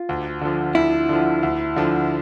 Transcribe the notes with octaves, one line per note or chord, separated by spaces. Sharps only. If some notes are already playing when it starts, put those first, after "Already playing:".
Already playing: F4
D2
D3 F3
D2 E4
D3 F3
D2
D3 F3